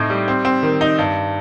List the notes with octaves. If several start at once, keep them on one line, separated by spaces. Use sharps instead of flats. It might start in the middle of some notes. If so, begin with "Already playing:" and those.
Already playing: A2 C4 D#4
G3
C4
C4
D#3
D#4
G2